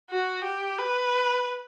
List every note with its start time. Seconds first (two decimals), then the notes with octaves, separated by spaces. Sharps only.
0.10 F#4
0.44 G4
0.79 B4